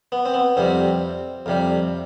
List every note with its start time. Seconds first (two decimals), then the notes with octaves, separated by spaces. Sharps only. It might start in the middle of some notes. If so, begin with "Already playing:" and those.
0.12 B3
0.26 C4
0.34 B3
0.57 F2 C3 G3 C4
1.46 F2 C3 G3